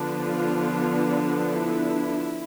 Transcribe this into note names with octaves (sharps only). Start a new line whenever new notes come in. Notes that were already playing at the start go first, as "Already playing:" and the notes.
Already playing: D3 F3 B3 D4
F4
E4